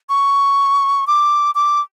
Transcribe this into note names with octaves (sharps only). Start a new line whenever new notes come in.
C#6
D6
D6